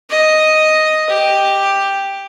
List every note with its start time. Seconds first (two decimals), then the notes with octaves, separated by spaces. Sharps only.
0.10 D#5
1.09 G4